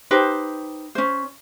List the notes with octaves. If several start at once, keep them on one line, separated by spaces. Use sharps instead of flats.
D#4 G4 B4 C5
C#4 C5